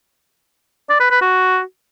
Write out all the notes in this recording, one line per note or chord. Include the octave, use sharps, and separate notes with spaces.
D5
B4
B4
F#4